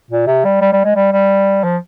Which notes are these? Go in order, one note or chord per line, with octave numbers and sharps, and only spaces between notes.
A#2
C3
G3
G3
G3
G#3
G3
G3
F3